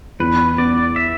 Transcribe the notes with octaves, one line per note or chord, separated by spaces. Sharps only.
E2 B4
B3 D5
E5